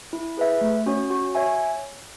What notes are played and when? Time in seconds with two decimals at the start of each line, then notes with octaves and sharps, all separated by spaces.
0.13 E4
0.37 G#4 B4 E5
0.61 A3
0.86 C#4 F#4 C#5
1.10 F#4
1.35 C#5 E5 G#5